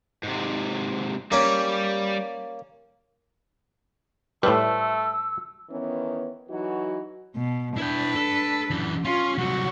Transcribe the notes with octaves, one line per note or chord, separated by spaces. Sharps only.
G#2 C3
G3 A#3 C#4
A2 G3 A3 B4 C5 E6
D#3 E3 B3 C#4
E3 F#3 D#4 F#4
B2
D4 E4 B4 G5
A4
F#2 E3
C#4 F4
C2 F#3 F#4